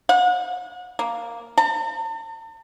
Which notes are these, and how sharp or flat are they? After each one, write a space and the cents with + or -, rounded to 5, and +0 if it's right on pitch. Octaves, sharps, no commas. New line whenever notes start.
F#5 -40
A#3 +0
A5 +45